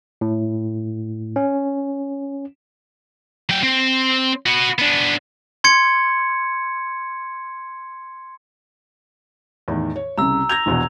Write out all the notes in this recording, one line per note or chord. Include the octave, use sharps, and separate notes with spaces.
A2
C#4
F#3 G5
C4
B3 F#4
B3 D4
C6 G#6 C#7
E2 A2 D#3
C#5
C2 C#3 A#5 E6
G6 G#6 A#6 F7
A#1 E2 B2